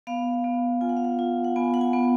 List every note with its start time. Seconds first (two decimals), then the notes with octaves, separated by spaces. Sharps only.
0.07 B3 F5
0.44 B3
0.81 F4 G#5
0.89 F#5
0.97 F5
1.04 F#5
1.19 F4
1.44 F#5
1.56 B3 G#5
1.74 F#5
1.81 G#5
1.93 B3